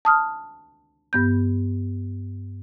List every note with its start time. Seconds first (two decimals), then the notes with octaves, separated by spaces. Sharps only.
0.05 A5 D#6 F6
1.13 G2 B3 G6